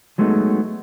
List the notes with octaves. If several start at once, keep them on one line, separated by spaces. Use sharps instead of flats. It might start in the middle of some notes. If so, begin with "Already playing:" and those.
F#3 G#3 A3 B3 D#4